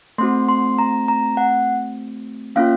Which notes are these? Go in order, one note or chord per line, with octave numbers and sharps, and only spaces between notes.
A3 C4 F#4 C6
C6
A#5
A#5
F#5
A#3 C#4 F4 F5